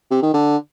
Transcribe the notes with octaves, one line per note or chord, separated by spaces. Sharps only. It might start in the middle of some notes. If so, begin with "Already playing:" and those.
C3
D#3
D3